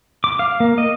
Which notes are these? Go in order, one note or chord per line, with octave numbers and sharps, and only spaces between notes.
D6
F5
A#3
D#5